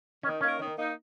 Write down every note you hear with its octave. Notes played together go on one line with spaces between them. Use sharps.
D#3 C#4
A#3 C#4 D#4 A#4
D#3
A#3 D#4 A#4